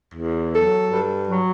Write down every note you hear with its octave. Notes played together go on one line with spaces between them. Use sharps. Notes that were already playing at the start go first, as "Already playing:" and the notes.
E2
F#3 A4
G2
F#3